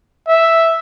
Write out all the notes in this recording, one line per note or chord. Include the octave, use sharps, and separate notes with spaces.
E5